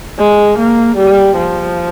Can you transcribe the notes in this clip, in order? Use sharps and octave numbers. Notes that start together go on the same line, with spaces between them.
G#3
A#3
G3
F3